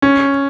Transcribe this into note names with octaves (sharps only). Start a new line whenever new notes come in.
C#4